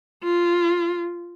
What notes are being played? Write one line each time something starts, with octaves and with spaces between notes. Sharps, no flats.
F4